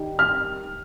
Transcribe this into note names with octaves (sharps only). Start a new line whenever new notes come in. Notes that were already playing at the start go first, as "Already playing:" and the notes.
Already playing: D#3 G3
F6